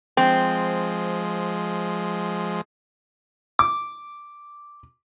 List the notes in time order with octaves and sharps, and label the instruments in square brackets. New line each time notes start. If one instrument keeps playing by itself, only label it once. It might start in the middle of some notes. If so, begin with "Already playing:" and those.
[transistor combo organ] F3 G#3 [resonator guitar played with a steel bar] C4
[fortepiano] D6